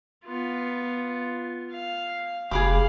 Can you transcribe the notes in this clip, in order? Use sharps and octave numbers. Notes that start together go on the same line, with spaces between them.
B3 F4
F5
F1 G#4 F5 B5 D6